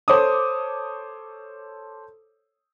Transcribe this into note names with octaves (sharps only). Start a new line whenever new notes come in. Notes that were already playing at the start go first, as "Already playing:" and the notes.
A4 C5 C#5 D6 D#6